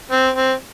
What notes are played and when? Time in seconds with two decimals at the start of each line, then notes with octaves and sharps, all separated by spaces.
0.11 C4
0.36 C4